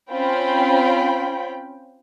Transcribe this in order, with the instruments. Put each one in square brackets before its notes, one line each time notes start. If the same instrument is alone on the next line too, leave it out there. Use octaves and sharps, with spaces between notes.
[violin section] C4 C#4 F4 G5 B5